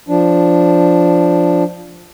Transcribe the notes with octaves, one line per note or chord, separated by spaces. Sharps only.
F3 D4